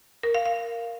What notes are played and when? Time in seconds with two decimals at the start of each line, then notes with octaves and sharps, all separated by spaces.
0.23 A#4
0.35 F5
0.46 F5